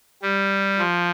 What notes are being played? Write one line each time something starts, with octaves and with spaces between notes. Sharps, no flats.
G3
F3